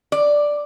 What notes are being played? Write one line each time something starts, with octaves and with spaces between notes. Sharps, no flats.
D5